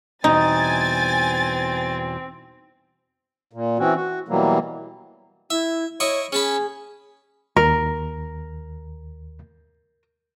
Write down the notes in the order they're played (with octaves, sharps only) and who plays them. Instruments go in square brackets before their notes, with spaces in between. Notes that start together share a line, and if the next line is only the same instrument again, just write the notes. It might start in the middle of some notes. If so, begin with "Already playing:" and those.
[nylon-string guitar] E2 B2 G3 [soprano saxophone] C4 [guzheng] D#4 [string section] G#5 A6
[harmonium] A#2
E3 C4 C#4 F#4
F#4
B2 E3 F#3 G3 A#3
[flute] E4 [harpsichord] E5
[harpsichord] E4 D#5 C#6 [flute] C#5
[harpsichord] C#4 A5 B5 [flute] G#4
[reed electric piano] D#2 [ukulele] A#4